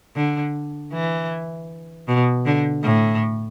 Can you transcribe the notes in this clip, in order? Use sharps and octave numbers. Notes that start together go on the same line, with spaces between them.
D3
E3
B2
D3
A2